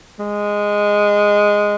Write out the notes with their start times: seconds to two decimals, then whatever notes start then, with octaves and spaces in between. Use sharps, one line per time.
0.19 G#3